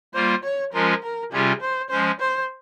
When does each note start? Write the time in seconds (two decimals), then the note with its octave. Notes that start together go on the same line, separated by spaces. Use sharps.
0.14 G3 A#3 F4 C5
0.44 C#5
0.73 F3 G#3 C#4 F4 A#4
1.03 A#4
1.32 C3 G3 C#4 F4 G#4
1.61 C5
1.90 F3 G#3 C#4 C5
2.20 C5